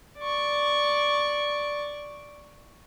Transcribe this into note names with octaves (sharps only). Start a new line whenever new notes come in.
D5 C#6